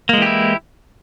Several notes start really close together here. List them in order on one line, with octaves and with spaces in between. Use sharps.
A#3 G#3 E3 G4 E4